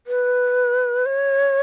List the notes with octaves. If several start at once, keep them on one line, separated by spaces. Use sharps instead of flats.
B4
C#5